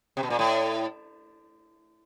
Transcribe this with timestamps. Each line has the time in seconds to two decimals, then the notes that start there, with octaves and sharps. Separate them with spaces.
0.17 C3
0.23 B2
0.30 A#2
0.39 A2